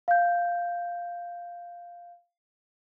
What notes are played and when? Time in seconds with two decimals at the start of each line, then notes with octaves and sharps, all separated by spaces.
0.08 F5 G6